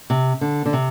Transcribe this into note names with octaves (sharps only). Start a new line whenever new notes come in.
C3
D3
D3
C3